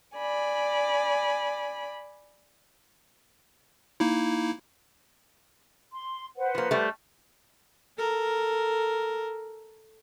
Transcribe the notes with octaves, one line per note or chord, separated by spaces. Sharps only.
D5 G#5 B5
A#3 D#4 E4
C6
B4 C5 F#5
F3 A#3
G3 A3
A4 A#4